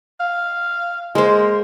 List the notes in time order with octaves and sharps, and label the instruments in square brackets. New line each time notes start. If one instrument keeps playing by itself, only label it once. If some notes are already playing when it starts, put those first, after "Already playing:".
[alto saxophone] F5
[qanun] G#3 C5 [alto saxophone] A#3